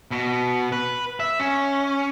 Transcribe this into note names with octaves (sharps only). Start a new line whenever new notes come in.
B2
B4
E5
C#4